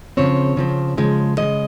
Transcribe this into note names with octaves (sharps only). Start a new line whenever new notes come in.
C#3 F3 C4 C#5
C#3 F3 C4
C#3 F3 G#3
C#3 F3 G#3 D#5